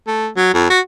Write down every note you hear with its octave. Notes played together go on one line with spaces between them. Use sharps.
A3
F#3
F2
F#4